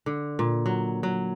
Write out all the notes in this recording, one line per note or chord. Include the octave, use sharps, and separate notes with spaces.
D3
A#2
F#3
F#3